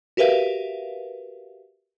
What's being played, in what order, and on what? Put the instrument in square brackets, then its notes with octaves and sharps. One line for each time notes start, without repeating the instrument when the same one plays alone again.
[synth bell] F#4 G4 A#4 B4 E5 F5